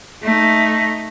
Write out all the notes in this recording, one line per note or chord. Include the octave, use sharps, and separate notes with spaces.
A3 D#4